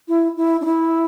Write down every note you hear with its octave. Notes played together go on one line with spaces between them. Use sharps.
E4
E4
D4
E4